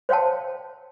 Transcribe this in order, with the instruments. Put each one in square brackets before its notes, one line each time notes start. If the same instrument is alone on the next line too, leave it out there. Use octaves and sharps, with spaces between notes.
[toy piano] C5 C#5 F5 G5 A5